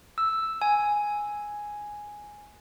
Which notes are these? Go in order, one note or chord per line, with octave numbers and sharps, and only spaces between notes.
E6
G#5